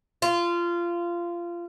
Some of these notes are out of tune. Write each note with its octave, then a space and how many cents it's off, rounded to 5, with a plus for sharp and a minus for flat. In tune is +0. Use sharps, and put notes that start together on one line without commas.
F4 -20